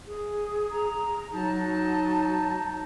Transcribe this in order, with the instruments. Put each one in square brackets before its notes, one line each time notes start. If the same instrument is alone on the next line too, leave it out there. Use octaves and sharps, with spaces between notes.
[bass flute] G#4
[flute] A#5
[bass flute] F#3 [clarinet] D#4 [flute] A5